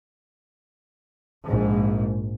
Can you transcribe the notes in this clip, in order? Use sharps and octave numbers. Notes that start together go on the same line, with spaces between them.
A#1 G#2